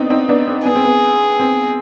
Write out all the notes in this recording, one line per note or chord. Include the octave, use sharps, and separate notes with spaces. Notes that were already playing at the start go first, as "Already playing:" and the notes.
Already playing: B3 C4 D4 D#4
C4 D#4
B3 D4
C4
B3 G#4
C4
B3
C4